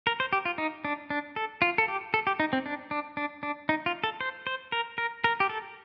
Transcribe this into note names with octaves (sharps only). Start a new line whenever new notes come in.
A#4
C5
G4
F4
D#4
D4
D4
A4
F4
A4
G4
A4
G4
D#4
C4
D4
D4
D4
D4
D#4
F4
A4
C5
C5
A#4
A#4
A#4
G4
A4